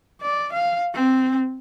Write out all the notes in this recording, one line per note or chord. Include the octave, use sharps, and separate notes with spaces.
D5
F5
C4